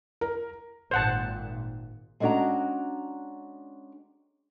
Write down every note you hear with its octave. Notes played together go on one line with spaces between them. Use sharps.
A#4
G#1 A#2 C5 F#5 A5
G#3 C#4 D4 F#4 G5 A#5